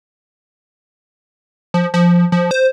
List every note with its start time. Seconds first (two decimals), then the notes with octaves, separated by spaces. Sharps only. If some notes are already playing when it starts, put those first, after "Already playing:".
1.74 F3
1.94 F3
2.32 F3
2.51 C5